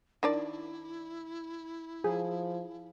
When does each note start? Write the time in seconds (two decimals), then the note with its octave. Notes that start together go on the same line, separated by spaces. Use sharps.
0.23 D#3 D4 E4 D5
2.04 F3 G#4